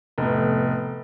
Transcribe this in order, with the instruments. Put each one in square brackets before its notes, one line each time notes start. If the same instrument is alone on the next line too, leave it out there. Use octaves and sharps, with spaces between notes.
[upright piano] F1 A2 B3